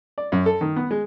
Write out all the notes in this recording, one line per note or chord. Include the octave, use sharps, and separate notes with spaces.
D5
F#2
A4
D#3
B3
G#3